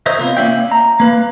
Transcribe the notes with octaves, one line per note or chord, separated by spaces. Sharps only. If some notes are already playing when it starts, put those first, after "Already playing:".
A#4 C5 C#5 D#5 E5
C3 B3 F4
A#3 C#4 D5 E5 F5 G5
A#5
A#3 B4 F5